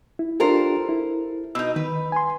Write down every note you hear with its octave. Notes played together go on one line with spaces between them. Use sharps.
E4
D4 F4 G4 A4 A#4 C5
E4
B2 D#4 E6
D#3 B4
G#5 C6